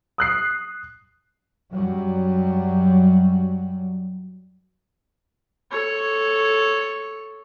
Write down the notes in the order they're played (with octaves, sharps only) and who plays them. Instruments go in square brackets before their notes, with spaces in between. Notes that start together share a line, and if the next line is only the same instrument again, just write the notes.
[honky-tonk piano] D#6 F#6 C7
[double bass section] F#2 F#3 G3
[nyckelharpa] A4 C#5